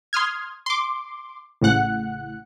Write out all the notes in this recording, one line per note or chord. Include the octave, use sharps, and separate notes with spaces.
C6 D#6 F6 G#6
C6 D6
A1 A2 C#3 F#5 F#6